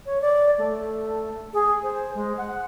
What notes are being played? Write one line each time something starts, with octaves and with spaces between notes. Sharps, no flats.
C#5
D5
A3
G#4
C5
G#3
F#5